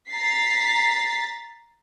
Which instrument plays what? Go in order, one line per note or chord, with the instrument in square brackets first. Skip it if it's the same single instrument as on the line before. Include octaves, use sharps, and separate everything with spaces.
[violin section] A#5 A6 B6 C7